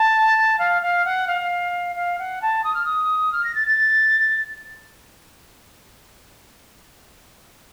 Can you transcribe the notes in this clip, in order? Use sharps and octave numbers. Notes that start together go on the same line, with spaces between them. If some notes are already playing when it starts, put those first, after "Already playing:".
Already playing: A5
F5
F5
F#5
F5
F5
F#5
A5
D#6
F6
D#6
F6
A#6
A6
A6